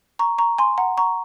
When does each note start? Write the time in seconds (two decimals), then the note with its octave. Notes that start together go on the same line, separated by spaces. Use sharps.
0.19 A#5 C#6
0.38 A#5 C#6
0.59 G#5 C6
0.78 F#5 A#5
0.97 A#5 C#6